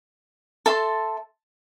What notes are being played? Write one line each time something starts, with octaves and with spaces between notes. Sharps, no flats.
A4 E5 A5 C6